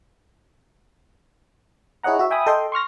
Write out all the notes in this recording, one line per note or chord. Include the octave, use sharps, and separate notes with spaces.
E4 G#4 C#5 D#5 F#5 A#5
F#4 E5
E5 G5 G#5 B5 D#6
A4 D#5 G5 C6
C6 C#6 F6 A#6